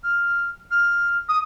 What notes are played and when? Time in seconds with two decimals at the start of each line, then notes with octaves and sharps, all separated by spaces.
0.03 F6
0.70 F6
1.28 D#6